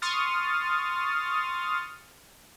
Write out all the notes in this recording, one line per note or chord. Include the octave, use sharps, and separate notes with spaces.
C6 C#6 D#6 F6 A6